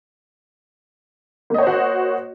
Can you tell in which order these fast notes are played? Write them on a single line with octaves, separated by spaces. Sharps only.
A#3 D#5 C#5 C5 F#4